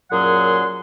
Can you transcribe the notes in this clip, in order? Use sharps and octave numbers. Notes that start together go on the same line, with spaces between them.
F#2 A#2 F#3 G#4 F#5 C6